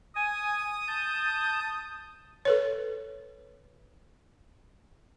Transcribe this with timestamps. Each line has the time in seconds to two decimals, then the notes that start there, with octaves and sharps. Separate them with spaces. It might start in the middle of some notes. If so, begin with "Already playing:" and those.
0.16 G#5 D#6
0.87 A5 G6
2.45 A4 B4 C#5